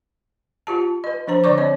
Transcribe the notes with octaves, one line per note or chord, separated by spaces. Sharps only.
F4 G4 A5
B4 D#5
F3 D4 C5 A#5
D3 C#5 D5 C#6 D6
C4 C#5 D#5